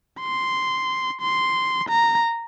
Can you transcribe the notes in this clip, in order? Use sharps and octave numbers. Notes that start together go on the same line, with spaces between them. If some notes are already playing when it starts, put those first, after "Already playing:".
C6
C6
A#5